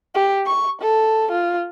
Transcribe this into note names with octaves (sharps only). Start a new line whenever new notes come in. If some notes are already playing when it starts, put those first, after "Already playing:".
G4
C#6
A4
F4